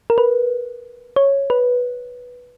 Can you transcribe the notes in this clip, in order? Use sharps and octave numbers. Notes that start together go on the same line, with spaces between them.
A#4
B4
C#5
B4